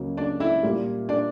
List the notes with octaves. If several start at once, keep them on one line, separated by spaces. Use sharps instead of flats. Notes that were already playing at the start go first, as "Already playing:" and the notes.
Already playing: C#2 C#3 F#3 A#3
D4 D5
E4 E5
A#2 G3 A#3
D4 D5